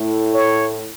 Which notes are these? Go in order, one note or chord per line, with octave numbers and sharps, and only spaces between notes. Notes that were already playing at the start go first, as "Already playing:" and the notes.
Already playing: A2
C#5